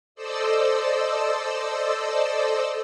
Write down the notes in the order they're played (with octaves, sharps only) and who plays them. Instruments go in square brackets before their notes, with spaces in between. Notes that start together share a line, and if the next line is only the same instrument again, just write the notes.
[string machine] A4 C5 D5 D#5 E6